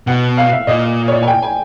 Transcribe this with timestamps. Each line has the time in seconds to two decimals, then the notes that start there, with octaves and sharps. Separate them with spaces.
0.07 B2 F#5
0.37 F5
0.52 E5
0.67 A#2 D#5
1.08 C#5
1.12 D5
1.23 G#5
1.27 G5
1.42 G#5